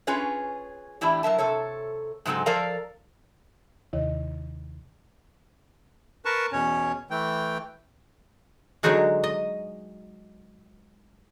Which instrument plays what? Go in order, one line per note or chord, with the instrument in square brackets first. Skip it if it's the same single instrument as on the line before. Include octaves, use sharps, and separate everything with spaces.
[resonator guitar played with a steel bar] C#4 F4 G#4 B4 C#5
A2 E3 D4 E4 G4
F#3 A#4 E5 A5
C3 A4 C#5
G#2 C#3 F#3 G#3 C4 A4
F3 A4 A#4 D5 F5 A#5
[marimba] D#2 C3 D#3 E4 C#5 D#5
[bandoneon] A#4 B4 A5 C#6
E2 B2 C#4 C#5
E3 A3 G5
[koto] D3 F#3 G#3 D#4 F#4 G#4
D#5